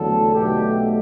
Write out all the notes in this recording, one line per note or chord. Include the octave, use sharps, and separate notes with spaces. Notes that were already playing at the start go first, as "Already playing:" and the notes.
Already playing: E2 D3 F#3 A3 A4
B1 B2 F#3 A3 G4